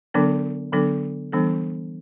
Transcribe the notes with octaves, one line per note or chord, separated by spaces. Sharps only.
D3 F#3 B3 D4 A4
D3 F#3 B3 D4 A4
E3 G3 B3 D4 A4